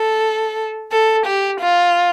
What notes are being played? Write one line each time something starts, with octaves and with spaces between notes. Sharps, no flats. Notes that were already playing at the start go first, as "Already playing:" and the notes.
Already playing: A4
A4
G4
F4